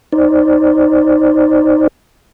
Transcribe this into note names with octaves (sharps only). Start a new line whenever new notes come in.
D#4 C5 D5